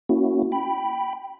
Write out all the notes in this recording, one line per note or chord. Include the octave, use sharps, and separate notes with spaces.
A#3 C#4 E4 F#4
G5 B5